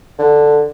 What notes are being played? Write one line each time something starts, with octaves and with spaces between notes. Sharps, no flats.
D3